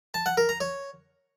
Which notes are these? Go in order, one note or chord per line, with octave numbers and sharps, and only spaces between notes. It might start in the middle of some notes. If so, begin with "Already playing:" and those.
A5
F#5
A#4
A#5
C#5